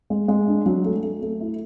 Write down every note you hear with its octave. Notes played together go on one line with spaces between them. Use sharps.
G#3
G#3
D4
F#3
A3
A3
A3
E4